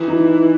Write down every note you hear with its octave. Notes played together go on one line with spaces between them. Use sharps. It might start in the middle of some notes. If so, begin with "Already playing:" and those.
Already playing: E3
D#4